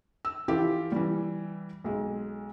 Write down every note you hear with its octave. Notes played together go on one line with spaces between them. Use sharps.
E6
E3 E4 F4 G4 A4
E3 G3
B1 G#3